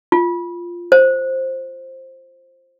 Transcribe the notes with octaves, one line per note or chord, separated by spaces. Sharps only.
F4
C5